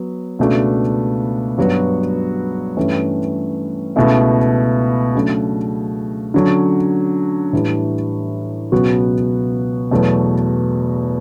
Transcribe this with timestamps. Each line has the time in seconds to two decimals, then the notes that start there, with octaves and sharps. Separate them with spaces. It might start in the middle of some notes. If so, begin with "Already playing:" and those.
Already playing: F#3 B3
0.39 C#2 B2 A3 D4 F#4
1.58 G2 F#3 B3 F#4
2.77 G2 E3 A3 C#4 G4
3.96 C#2 B2 A3 E4
5.15 C#3 F#3 A3 D4
6.34 D3 F#3 C#4
7.53 A2 E3 G3 D4
8.72 C#2 B2 F#3 B3 F#4
9.91 E2 B2 F#3 A3